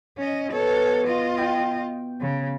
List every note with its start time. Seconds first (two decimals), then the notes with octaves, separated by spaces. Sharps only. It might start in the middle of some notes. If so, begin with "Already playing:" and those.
0.18 C#4 D#5
0.52 B2 A4 C#5
1.07 F4 D#5
1.38 G5
2.21 C#3